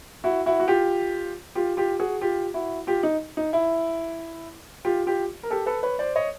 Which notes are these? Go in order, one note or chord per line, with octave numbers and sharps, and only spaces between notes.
E4 F#4
E4 F#4
F#4
F4 G4
F4 G4
F4 G4
F#4 G#4
F4 G4
E4 F#4
F4 G4
D#4
D#4
E4
F4 G4
F4 G4
A#4
G4 A4
A4 B4
B4 C#5
C5 D5
C#5 D#5